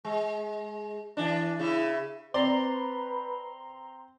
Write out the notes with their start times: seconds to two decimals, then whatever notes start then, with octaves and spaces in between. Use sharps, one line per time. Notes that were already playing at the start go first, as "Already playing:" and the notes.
0.05 G#3
1.17 E3 D4
1.59 C#3 E4
2.34 C4 B4 D5 A#5 C6